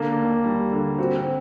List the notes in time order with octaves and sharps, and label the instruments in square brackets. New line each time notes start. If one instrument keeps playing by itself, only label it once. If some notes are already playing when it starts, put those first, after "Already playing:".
Already playing: [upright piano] D3 D4 [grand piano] A#3
[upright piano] D#2
G3
D3
[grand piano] C4 [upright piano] F#4
[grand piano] C4